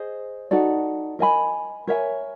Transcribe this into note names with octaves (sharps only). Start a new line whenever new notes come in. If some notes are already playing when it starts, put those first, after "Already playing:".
Already playing: G#4 C5 D#5
D#4 F#4 A4 D5
A#4 D#5 G#5 B5
A#4 C#5 E5 G#5